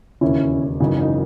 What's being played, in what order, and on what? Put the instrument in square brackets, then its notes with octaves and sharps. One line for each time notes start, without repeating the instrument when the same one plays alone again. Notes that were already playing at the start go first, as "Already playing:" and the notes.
[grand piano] E1 D#2 C#3 [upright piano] C#4 E4
[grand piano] G#1 F#2 C#3 E3 [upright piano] D#4
[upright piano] D#4